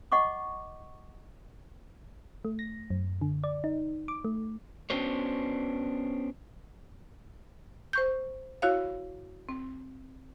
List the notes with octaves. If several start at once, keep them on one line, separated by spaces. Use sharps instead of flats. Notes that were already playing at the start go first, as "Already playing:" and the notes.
D#5 F#5 C#6 D6
A3
A#6
F#2
D3
D5
D#4
D6
A3
B3 C#4 D4 F#4 C5 C#5
C5 C#6 G6
E4 F#4 C#5 F5
C4